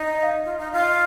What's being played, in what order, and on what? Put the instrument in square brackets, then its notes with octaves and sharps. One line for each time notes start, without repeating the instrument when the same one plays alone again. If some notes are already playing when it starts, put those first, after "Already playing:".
Already playing: [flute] D#4
[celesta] D#5
F5
D#5
[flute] F4
D#4
[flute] F4 [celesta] F5
[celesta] D#5